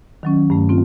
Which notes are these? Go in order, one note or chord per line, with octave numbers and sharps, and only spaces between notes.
D#3 F#3 C#4
G2 A3
C4 F4